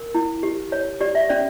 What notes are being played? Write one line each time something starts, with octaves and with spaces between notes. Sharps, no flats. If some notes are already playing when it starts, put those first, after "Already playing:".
Already playing: A#4
E4
G4
C#5
G4 D5
E5
C#4 D5